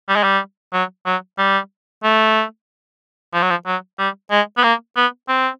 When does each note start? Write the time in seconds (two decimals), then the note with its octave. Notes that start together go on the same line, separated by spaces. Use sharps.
0.09 G3
0.16 G#3
0.23 G3
0.73 F#3
1.06 F#3
1.39 G3
2.04 A3
3.34 F3
3.42 F#3
3.50 F3
3.66 F#3
3.99 G3
4.31 G#3
4.58 B3
4.64 A#3
4.97 B3
5.29 C4